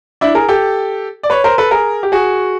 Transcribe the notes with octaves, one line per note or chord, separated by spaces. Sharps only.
D4 E4
G#4 A#4
G4 A4
D5
B4 C#5
A#4 C5
A4 B4
G#4 A#4
G4
F#4 G#4